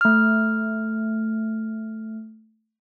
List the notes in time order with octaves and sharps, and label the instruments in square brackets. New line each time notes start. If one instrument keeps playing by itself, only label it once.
[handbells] A3 F6